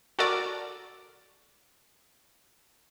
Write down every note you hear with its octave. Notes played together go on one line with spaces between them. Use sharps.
F#4 A4 A#4 D5